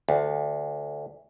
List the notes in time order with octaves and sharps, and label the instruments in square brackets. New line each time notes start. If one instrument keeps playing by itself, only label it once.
[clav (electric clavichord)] D2